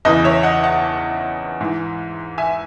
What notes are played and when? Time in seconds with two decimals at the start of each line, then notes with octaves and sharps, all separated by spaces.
0.05 E2 C#3 E3 B4 D#5
0.24 C#5 E5
0.43 D#5 F#5
0.63 F#5 A5
1.61 G#2 E3
2.38 E5 G#5